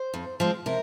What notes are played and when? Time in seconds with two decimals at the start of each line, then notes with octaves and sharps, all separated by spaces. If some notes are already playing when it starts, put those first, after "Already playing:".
Already playing: C5
0.14 F2
0.40 F3 G#3 C4
0.66 C3 A#4